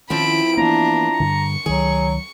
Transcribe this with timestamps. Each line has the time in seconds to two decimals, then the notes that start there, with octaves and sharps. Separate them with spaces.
0.10 D#3 F3 C4 C#4 E4 B5 D7
0.57 E3 A#3 B3 D4 A#5
1.20 G2 D3 C#6
1.66 C#2 D#3 F#3 G#4